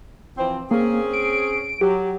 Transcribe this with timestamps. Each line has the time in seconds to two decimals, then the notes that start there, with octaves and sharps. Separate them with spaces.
0.38 E3 F3 C4
0.71 A#3 C4 C#4 G#4
1.13 D7
1.81 F#3 G4